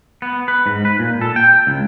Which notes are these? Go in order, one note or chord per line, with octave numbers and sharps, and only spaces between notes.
B3
B4
G#2
B4
A#2
A4
G5
C#2